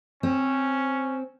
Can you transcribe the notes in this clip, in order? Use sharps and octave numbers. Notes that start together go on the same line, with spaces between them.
C4 C#4